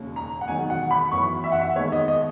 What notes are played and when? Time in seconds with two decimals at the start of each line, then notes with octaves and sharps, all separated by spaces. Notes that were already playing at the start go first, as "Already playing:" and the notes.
Already playing: E1 D#2 C#3
0.16 A#5
0.41 F#5
0.48 E1 E2 D#3 F#3 G#5
0.70 F#5
0.91 B5
1.12 F#2 E3 B3 C#6
1.44 E5
1.52 F#5
1.61 E5
1.75 D#2 D#3 G#3 B3 C#5
1.92 D#5
2.08 D#5